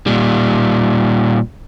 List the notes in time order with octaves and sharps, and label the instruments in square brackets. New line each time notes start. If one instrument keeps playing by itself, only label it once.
[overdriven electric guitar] A#2 G3